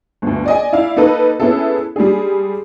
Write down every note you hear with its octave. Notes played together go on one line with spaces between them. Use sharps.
G1 D2
D5 D#5 G#5
E4 D5 F5
A#3 D#4 A4 B4
B3 C#4 E4 G#4 A4
G3 G#3 D4 G#4